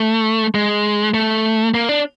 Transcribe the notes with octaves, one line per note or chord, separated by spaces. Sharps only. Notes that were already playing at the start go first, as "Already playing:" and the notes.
Already playing: A3
G#3
A3
A#3
D4